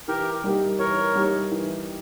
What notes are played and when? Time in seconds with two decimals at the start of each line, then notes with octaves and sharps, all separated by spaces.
0.08 E3 G4 A#4
0.44 G3 A#3 D#4 G4
0.79 E3 A#4 C#5
1.15 G3 A#3 D#4 G4
1.52 E3